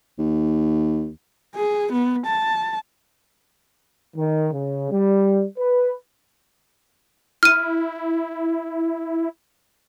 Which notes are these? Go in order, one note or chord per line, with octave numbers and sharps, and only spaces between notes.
D#2
G#4
B3
A5
D#3
C#3
G3
B4
E4 F6 D#7